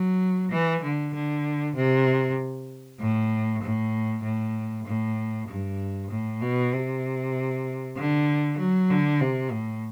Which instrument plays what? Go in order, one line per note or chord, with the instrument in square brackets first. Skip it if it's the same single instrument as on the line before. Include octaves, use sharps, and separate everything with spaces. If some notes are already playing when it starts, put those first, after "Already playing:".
Already playing: [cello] F#3
E3
D3
D3
C3
A2
A2
A2
A2
G2
A2
B2
C3
D3
F#3
D3
C3
A2